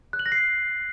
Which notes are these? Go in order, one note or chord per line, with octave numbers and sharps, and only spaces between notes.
F#6
F#7
A#6
C7